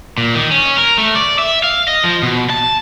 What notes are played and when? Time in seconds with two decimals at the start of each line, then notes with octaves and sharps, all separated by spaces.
0.18 A#2
0.35 D#3
0.51 C#4
0.78 A#4
0.98 A3
1.15 D5
1.39 E5
1.64 F5
1.88 D#5
2.04 F3
2.23 B2
2.50 A5